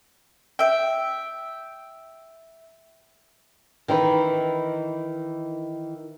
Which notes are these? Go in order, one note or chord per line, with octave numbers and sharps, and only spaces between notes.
E5 G5
D#3 E3 D#4 B4